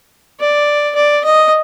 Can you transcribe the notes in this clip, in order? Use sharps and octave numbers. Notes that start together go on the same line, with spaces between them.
D5
D5
D#5